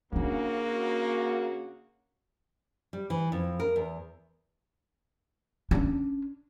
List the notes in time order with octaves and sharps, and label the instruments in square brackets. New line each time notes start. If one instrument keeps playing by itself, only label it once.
[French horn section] C#3 F#4 [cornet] A#3 [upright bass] D4 D#4
[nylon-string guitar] G3
E3
F2
A#4
E2
[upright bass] C#4 D4